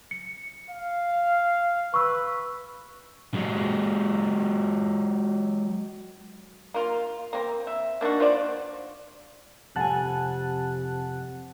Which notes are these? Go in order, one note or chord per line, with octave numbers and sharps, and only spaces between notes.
C#7
F5
B4 C#6 E6
F#3 G#3
A#3 F4
A#3 C4
E5
A#3 D4 D#4 F#4
F4 C5 D5
F2 C3 F#5 G#5 A5 F#6